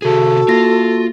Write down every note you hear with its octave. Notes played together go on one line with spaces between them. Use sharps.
C3 F#4 G#4 A4
A#3 F4 A#6